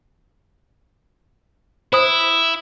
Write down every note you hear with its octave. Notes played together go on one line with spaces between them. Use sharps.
E4 C5 D#6